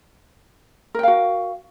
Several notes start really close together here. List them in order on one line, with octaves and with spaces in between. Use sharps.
A#4 G5 F5 F#4